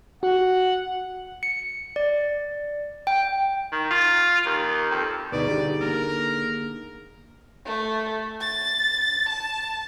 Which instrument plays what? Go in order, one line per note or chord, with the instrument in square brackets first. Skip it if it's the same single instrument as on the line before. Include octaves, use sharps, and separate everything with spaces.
[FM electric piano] F#4 [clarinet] F#5
[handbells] C#7
D5
G5
[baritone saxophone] D#3
F4
D#2
F2
[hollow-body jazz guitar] D2 B2 B4 [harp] D#4 G#4 [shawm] D5
[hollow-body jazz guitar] D3 G4
[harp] A#3 [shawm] A#4
[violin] A3
A6
A5